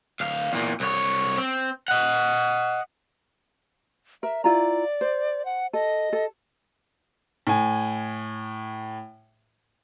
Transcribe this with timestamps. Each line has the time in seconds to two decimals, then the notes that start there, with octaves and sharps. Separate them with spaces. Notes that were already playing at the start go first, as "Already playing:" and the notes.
0.20 D2 F5
0.52 E2 A#2
0.80 C2 C#5
1.38 C4
1.88 D#5 F#5
4.23 A#4 E5
4.44 E4 F4 D5 A#5
5.01 C5
5.45 F#5
5.73 A4 D#5
6.13 A4
7.47 A2 G#5